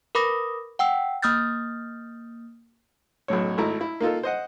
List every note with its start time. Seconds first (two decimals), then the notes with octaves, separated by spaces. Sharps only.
0.15 A#4 B4 B5 D6 D#6 A#6
0.79 F#5 G5 E6
1.22 A#3 D#6 F6 G6 A6
3.28 B1 F#2 A2 C#5
3.58 G#1 A3 E4 A#5
3.81 E4
4.01 A#3 D#4 F4 A4
4.23 C5 D#5 F#5